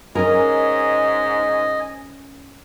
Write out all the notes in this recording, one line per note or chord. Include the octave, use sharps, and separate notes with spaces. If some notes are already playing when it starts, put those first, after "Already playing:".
G#2 C#4 A#4 D#5 G#5